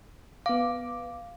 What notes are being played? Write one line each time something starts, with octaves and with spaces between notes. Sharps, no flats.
B3 F5 D6